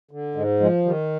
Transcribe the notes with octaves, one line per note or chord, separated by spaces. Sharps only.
D3
G#2 G#3
F3 G#3
D#3 G3